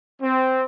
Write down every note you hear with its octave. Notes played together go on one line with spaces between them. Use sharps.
C4